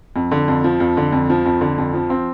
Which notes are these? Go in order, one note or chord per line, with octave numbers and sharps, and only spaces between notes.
F2
D3
F2
F3
F2
D3
F2
F3
F2
D3
F2
F3
C4